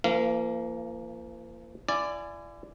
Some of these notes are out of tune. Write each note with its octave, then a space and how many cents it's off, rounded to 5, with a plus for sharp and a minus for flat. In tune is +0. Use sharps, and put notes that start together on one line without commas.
F3 -45 A#3 -15 F5 -35
E4 +40 D5 +0 G#5 +0